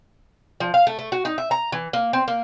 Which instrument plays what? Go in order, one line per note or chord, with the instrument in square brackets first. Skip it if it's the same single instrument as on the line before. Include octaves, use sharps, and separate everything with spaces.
[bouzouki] F3
F5
A3
A3
F#4
D#4
E5
A#5
E3
A#3
C4
A#3